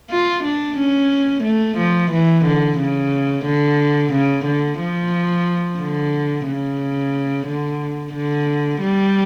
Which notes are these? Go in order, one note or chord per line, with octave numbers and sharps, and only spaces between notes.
F4
D4
C#4
A3
F3
E3
D3
C#3
D3
C#3
D3
F3
D3
C#3
D3
D3
G3